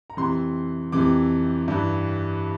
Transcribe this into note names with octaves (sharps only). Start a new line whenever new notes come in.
A#5
F2 C3 E3 C6
F2 C3 E3 D6
G2 E3